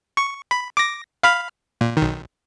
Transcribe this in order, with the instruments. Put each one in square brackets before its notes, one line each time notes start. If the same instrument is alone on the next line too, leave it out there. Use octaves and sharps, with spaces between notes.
[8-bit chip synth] C#6
B5
D6 A#6
F5 B5 F6
A#2
B1 D#3